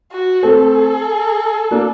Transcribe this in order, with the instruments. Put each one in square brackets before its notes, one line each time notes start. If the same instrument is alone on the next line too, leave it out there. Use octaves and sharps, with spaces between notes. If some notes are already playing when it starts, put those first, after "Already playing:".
[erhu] F#4
[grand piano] A3 C4 [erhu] A4
[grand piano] A#3 D4